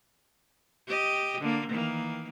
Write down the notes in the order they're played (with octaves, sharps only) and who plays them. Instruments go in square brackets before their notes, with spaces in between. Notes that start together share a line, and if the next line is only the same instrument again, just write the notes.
[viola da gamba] G4 D#5
D3 A#3
D#3 E3 A#3